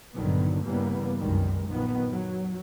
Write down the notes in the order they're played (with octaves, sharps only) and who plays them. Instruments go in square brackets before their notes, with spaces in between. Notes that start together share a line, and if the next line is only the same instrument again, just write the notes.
[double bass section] A#1 G2 D3 D#3 F#3 B3
G2 C#3 E3 G3 A#3 B3
C2 F#2 D#3 G3 G#3
A#1 F#2 D#3 F3 B3
F#3